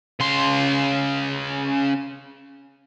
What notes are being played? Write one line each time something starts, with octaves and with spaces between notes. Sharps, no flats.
C#3 C6